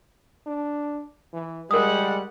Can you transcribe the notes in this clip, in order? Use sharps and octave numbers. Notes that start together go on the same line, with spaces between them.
D4
E3
G3 G#3 A#4 F#5 D#6